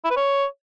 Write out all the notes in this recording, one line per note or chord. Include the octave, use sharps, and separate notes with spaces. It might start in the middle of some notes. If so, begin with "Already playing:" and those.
E4
B4
C#5